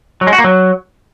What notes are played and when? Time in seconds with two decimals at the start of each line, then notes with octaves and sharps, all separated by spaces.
0.21 F#3
0.27 G#3
0.33 F#4
0.39 A#3
0.44 F#3